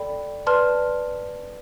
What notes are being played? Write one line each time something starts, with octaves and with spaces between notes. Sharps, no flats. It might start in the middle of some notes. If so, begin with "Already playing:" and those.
Already playing: A4 D5 G5 B5
B4 D5 A5 C6 F6